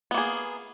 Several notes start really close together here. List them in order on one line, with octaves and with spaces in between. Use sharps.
B3 A#3 G#4